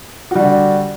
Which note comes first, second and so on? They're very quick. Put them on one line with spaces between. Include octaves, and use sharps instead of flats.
F#4 G3 D4 D3